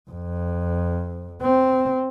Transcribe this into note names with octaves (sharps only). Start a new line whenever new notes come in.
F2
C4